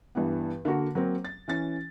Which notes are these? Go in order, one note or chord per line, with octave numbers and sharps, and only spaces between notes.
G2 E3 B3
D3 A#3 F#4 A#4
F#3 A#3 C4
A6
E3 C#4 A6